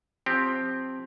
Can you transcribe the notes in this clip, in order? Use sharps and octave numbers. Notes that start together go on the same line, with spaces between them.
F3 C4 G4